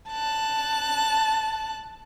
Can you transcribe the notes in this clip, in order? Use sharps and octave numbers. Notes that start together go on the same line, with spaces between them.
A5 F#6